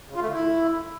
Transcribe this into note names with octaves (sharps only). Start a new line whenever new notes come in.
C#3
F4
A3
D3
E4